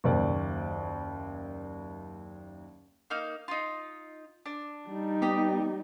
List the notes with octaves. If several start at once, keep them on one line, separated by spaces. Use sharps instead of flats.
F#1 D#2 D5
A#3 D#4 F6
D#4 F4
D4
G3 D#4
B3 G4 D#5